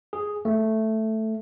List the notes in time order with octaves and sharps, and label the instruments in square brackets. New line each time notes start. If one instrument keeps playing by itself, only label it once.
[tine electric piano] G#4
A3